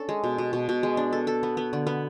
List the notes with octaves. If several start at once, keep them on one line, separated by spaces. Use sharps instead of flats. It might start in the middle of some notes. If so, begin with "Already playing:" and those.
Already playing: C#4 D4 A4
G#3
B2
B2
B2
B2
G#3
D4
A4
A4
B3
B3
D3
B3